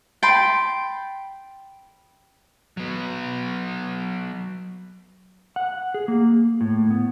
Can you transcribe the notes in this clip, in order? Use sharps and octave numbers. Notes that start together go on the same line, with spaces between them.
G5 A5 B5 C6
F#3 B3
F#5
G#4
A#3
A2
B3